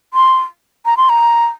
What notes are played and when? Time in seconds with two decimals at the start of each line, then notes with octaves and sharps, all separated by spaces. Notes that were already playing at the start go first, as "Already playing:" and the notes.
0.14 C6
0.86 A#5
0.97 C6
1.09 A#5